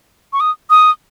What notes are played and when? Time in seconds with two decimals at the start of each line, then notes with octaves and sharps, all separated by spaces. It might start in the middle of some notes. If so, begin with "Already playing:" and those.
0.33 C#6
0.40 D#6
0.70 D#6